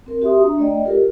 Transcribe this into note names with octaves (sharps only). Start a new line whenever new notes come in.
C4 A#4
F#4 G4 E5 C6 D#6
D4 A#5
A3 D5 D#5 G5
F4 G4 A4 A#4